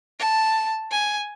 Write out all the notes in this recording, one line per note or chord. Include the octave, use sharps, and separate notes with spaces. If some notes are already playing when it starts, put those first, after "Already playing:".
A5
G#5